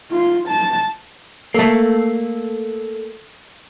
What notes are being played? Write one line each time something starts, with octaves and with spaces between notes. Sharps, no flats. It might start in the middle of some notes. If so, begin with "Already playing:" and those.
F4
A5
A3 A#3 A4